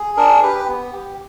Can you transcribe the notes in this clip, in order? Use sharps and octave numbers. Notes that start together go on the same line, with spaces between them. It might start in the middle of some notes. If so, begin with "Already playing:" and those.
Already playing: G#4
D4 A#4
G4 B4
B3
G4